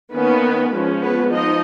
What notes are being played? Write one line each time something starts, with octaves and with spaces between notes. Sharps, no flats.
D#3 A#3 B3 C#4 B4
F3 G#3 C#4
B3 B4
F3 D#4 D#5